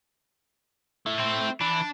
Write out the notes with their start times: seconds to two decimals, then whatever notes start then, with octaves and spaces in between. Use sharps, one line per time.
1.06 A3 E4
1.19 C4
1.61 E3 D4